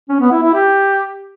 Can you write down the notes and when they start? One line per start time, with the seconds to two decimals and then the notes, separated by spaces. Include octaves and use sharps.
0.09 C#4
0.21 B3
0.32 E4
0.43 E4
0.54 G4